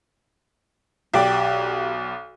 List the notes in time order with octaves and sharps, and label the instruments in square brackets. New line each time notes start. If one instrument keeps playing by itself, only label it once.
[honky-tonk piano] B1 D5 [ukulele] G4